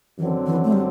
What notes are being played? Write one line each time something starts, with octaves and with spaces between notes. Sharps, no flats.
F#2 D3 E3 F#3 C4
E3
A3
G3